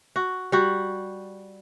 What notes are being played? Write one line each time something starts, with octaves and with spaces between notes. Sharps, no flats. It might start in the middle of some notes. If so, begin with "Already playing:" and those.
F#4
G3 F#4